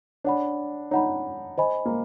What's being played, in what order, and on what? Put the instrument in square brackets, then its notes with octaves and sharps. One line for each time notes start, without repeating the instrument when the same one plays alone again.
[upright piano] D4 [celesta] C#5 F#5 B5
[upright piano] D#4 [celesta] C#5 F#5 B5
[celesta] C5 D#5 G#5 B5
[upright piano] A#3